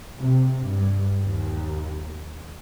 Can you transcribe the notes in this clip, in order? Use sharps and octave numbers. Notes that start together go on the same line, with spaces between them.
C3
G2
D#2